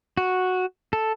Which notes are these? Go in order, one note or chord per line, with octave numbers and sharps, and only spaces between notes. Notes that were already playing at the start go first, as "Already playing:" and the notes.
F#4
A4